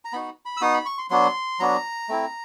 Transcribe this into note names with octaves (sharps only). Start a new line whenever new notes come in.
A#5
B3 D#4 F#4 B5
B5
E6
B3 D#4 F#4 D#6
B5
C#6
C6
F#3 B3 D4 F#4 C6
F#3 B3 D4 F#4 A#5
A3 C4 E4